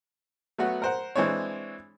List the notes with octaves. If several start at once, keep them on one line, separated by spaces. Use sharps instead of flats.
F#3 A3 B3 F#4
A#4 C5 F#5
E3 G#3 C4 D4 C#5